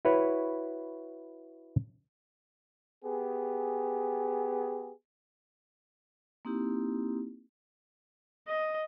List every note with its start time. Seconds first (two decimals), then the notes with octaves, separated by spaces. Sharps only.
0.05 E4 F#4 B4 C#5
3.05 B3 G4 G#4
6.45 A#3 C4 D#4 E4 G4
8.48 D#5